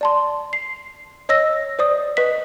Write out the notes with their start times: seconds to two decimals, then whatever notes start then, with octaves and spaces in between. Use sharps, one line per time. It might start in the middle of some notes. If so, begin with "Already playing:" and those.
0.01 D5 A5 C6
0.53 C7
1.29 C#5 D#5 E6 A#6
1.79 C5 D5 D#6
2.17 B4 D#5 B6